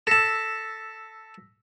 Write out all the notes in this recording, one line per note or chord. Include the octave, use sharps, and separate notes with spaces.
A4 A5 E6 A#6 B6